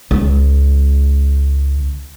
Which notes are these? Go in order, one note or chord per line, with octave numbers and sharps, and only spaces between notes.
C#2 G#3